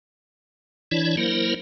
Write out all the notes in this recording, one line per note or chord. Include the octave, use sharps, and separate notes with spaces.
E3 D4 E4 C#5 D5
F#3 A#3 E4 A#4 C5